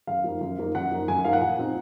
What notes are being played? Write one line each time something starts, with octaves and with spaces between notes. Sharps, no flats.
F#2 F5
F3 A#3 D#4
F#2
F3 A#3 D#4
F#2 F#5
F3 A#3 D#4
F#2 G#5
F3 A#3 D#4 F5
F#5
A#2
F3 C4 D#4